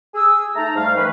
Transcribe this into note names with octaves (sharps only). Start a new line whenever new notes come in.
G#4 E6
A3 D#4 A5 A#5
G#2 G3 A3 F5
D#3 E3 A3 C#4 B4